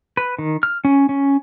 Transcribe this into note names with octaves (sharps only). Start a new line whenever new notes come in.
B4
D#3
F6
C#4
C#4